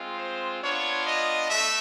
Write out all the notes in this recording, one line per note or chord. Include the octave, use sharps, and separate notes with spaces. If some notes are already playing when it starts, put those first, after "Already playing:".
Already playing: G#3 C4 F4
C5
B3 D4 F4 C#5
D#5
A3 E5